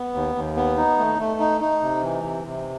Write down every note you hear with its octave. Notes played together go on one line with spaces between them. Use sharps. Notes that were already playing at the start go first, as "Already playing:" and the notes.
Already playing: B3
D#2
D#2
B3
D#4
A3
A3
D#4
D#4
C3
E3
C3
C3